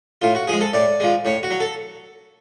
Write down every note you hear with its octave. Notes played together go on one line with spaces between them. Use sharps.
A2 F4
F#4
F3 G#3 G#4
A4
A2 D5
F3 G#3
A2 C#5
F#4
F#3
A4